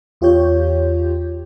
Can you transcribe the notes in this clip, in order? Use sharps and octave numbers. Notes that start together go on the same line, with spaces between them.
E2 F4 G4 C#5 G6